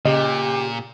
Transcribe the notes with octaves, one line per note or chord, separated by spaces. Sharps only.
A#2 C#3 G4 D#5